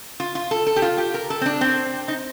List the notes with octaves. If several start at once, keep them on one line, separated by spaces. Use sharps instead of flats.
F4
F4
A4
A4
G4
F4
G4
A#4
A4
C4
D4
C4
D#4